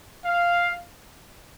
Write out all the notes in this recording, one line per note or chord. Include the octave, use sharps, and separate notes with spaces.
F5